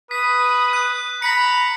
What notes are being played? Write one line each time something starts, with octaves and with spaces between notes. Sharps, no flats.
B4 D#6 B6
F#6
A#5 B5 B6 C#7